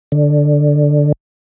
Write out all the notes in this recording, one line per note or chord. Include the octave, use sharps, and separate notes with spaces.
D3